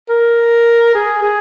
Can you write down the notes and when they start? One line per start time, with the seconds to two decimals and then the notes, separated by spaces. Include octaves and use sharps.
0.09 A#4
0.95 G#4
1.23 G#4